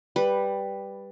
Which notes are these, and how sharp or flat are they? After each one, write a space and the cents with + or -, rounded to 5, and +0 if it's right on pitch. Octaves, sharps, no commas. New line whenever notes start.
G3 +5 B4 +0